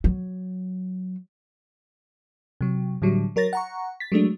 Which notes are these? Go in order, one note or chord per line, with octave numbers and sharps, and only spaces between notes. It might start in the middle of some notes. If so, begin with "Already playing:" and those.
F#3
C3 F#3
A2 D3 F#3 G3
F#3 A#4 C#5 A6 A#6
F#5 A#5 C#6
A6 B6
F#3 G#3 A3 D4